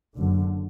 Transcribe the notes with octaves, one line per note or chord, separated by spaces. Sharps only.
F#1 F#2 D3